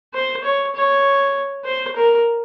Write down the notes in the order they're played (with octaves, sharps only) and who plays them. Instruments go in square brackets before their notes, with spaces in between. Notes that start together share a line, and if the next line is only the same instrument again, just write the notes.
[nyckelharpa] C5
C#5
C#5
C5
A#4